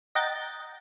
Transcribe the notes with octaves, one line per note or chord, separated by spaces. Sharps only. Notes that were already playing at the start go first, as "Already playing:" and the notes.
D#5 F#5 G5 A#5 G6 A6